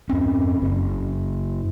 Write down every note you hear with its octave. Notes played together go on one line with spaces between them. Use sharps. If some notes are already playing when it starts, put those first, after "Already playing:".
F2 C4 C#4
F#1